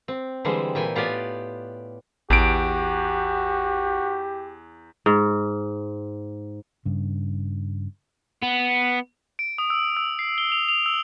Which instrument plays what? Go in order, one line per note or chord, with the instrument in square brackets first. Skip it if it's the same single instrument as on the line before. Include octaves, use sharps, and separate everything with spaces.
[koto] C4
D3 E3 G3 G#3 C5
A#2 E3 G5 G#5
A2 B3 F4 G4 D5 G#5
[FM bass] A1 [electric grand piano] E2 D7 [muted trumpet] F#4 [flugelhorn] G4
[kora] G#2
[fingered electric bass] G2 C#3
[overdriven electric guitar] B3
[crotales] D7
D#6
E6
E6
C7
G7
F7
F7
E6